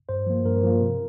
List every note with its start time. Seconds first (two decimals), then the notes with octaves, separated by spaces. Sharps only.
0.09 G2 C5
0.27 F3 A#3
0.45 G2 A#4
0.63 F3 A#3
0.81 C3